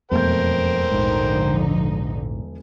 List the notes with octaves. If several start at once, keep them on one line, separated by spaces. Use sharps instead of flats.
E1 F2 A3 A#4 C5 G5 G6
A#1 G#2 D3 F3 D#4